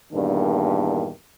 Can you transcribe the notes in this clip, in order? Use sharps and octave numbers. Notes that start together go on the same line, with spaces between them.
E2 G2 A#2 D#3 D4